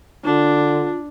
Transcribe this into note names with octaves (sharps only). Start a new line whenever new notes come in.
D3 D4 F4